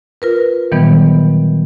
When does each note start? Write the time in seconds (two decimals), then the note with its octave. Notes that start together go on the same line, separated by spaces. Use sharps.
0.22 F4 A#4 B4
0.72 A#2 D#3 E3 F#3 G3 B3